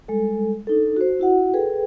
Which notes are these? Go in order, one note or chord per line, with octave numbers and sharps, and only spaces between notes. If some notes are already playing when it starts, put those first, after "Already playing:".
G3 G#3 A4
D4 D#4 A4
F#4 C5
E4 F#4 F#5
G#4 A4 B4 G5